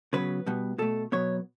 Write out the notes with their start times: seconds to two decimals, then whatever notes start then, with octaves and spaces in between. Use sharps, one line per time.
0.13 C#3 F#3 B3 B4
0.46 B2 G3 B3
0.78 B2 A3 A4
1.12 B2 F#3 B3 C#5